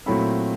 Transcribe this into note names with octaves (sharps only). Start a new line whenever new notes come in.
A#2 F#3 A3 C4 E4 B5